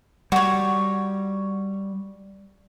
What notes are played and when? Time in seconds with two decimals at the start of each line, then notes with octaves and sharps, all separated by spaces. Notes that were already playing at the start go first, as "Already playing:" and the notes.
0.32 G3 F#4 C#5